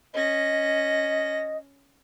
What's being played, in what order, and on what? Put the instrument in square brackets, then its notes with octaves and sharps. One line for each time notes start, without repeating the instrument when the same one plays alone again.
[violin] C#4 A#6 [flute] D#5